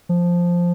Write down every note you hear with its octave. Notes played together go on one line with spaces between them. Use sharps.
F3